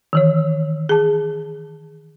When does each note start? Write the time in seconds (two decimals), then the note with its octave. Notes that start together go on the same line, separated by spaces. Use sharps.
0.13 D#3 E3 C#5
0.89 G#4 A5